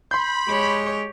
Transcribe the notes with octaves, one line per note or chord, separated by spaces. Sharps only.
B5 C6 G6
G#3 G4 C#5